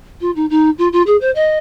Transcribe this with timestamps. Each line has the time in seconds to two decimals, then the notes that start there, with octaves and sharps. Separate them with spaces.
0.21 F4
0.36 D#4
0.50 D#4
0.78 F4
0.93 F4
1.07 G#4
1.21 C5
1.35 D#5